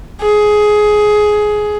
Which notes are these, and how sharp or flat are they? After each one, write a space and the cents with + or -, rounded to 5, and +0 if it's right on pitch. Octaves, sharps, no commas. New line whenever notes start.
G#4 +15